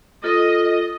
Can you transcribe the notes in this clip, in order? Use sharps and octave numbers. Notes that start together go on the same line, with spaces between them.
F4 A4 D#5